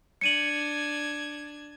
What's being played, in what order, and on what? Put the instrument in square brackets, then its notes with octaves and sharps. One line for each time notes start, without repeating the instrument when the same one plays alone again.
[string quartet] D4 G#6 [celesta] C#7 D#7 F#7